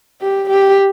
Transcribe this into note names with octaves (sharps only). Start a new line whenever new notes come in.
G4
G4